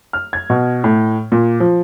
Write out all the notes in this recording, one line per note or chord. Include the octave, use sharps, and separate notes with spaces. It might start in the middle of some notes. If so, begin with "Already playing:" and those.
F6
G#6
B2
A2
A#2
F3